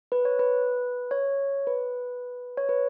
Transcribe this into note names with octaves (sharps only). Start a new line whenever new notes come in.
B4
C#5
B4
C#5
B4
C#5
B4